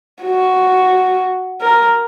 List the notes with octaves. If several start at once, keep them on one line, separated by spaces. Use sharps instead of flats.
F#4
A#4